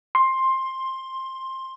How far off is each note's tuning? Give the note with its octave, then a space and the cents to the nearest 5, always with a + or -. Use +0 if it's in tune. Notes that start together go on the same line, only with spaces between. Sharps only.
C6 +15